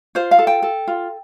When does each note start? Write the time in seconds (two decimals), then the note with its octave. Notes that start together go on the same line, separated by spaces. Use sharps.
0.15 F4 C5
0.31 F5
0.39 A4
0.47 G5
0.63 A4
0.88 F4